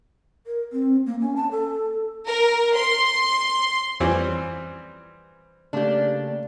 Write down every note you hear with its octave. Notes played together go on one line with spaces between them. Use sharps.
A#4
C4
A#3
C#4
A5
A4
A#4
C6
F2 E3 G3 C4 C#4
C#3 A3 A#3 D4 G4